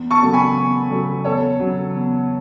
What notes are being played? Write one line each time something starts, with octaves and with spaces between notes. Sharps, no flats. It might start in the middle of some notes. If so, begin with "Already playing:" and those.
Already playing: E2
A5 C#6
C#3 F#3 A3
G#5 B5
E2
C#3 F#3 A3
E2 A4 C#5
C#3 F#3
E2